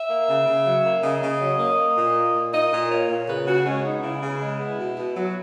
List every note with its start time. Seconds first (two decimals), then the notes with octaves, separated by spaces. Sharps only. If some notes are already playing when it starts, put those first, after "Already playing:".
Already playing: E5
0.09 A#3
0.27 C#3
0.46 C#3
0.65 F#3
0.84 A#3
1.02 C#3 D#5
1.21 C#3
1.40 F#3
1.59 A#3
1.78 A#3
1.96 A#2
2.15 A#3
2.34 A#2
2.53 A#3 D#5
2.72 A#2
2.90 A#3 C#5
3.09 A#2
3.28 C#3 B4
3.46 C#3 F#4
3.65 G#3 C#4
3.84 B3 D#4
4.03 C#3 E4
4.21 C#3
4.41 G#3
4.59 B3
4.77 B2
4.97 B2
5.15 F#3